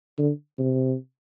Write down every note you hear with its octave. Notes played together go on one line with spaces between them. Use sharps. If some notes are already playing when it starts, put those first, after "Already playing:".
D3
C3